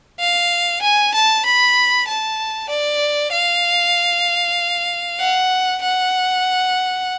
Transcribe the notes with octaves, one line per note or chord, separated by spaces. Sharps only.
F5
G#5
A5
B5
A5
D5
F5
F#5
F#5